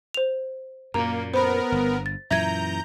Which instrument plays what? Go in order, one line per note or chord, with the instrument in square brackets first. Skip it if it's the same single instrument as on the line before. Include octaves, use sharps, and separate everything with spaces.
[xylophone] C5 F7
[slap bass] F#2 A#2 [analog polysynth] A#3 [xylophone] A#5
[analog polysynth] B3 A#4 [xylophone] C5 B5
[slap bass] G1
[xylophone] A6
[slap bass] F#2 A#2 E3 [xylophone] E5 G#6 [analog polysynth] A#5 G6